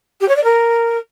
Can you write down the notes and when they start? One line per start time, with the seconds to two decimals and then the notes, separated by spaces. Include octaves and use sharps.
0.20 G4
0.28 C#5
0.36 D5
0.44 A#4